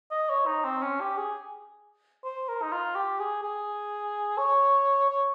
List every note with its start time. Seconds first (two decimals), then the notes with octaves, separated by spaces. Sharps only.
0.11 D#5
0.30 C#5
0.47 D#4
0.65 C4
0.82 C#4
1.01 G4
1.17 G#4
2.24 C5
2.49 A#4
2.62 D#4
2.72 F4
2.95 G4
3.20 G#4
3.43 G#4
4.38 C#5
5.10 C#5